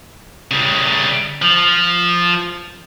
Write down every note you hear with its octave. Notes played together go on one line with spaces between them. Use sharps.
C#3 G3
F3